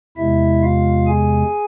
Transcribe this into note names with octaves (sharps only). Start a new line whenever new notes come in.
E2 C3 G#3 E4 E5
F4 F5
G#4 G#5